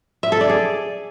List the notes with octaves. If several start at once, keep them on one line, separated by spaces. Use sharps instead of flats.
E5
A4
D5
G#4